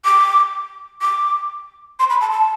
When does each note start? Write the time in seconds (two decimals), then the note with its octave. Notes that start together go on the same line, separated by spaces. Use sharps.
0.05 D6
1.02 D6
1.99 C6
2.10 B5
2.21 A5
2.31 A5